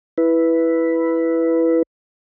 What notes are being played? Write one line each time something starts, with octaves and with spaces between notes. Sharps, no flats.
E4 B4